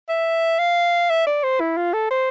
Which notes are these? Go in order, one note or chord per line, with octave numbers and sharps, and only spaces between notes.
E5
F5
E5
D5
C5
E4
F4
A4
C5